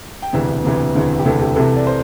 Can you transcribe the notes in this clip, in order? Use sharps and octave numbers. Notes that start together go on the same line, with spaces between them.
G5
E1 D2 C3 E3 E5
E1 D2 C3 E3
E1 D2 C3 E3
G4
E1 D2 C3 E3 A4
G4
C2 C3 E3 A4
D5
C5